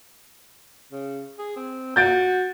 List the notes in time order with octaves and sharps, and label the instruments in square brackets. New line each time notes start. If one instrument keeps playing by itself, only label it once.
[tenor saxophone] C#3
G#4
C4
[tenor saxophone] F#4 [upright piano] G6 A6 D7